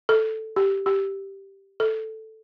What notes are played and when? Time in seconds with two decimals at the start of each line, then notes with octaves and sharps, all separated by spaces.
0.09 A4
0.56 G4
0.86 G4
1.80 A4